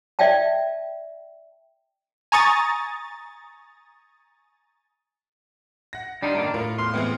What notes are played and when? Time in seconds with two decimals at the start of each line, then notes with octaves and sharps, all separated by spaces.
0.19 D5 E5 F5 G5 A5
2.32 G#5 A#5 C#6 D#6 A6
5.93 F#5 A#6
6.23 G3 D4 D#4 F4
6.35 F#2 A2 D#3 A#3
6.54 A2 F4 A#4
6.78 E2 C6 F6
6.94 E3 G#3 B3 C4